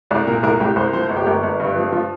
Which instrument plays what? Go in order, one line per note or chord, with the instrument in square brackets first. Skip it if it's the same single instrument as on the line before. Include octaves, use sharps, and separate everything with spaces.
[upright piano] C2 D5
A#2 A#4
C2 A#4
C2 G4
C2 C5
F3 C5
G1
G4
G1 A#4
G1
G2
F3
F3 F4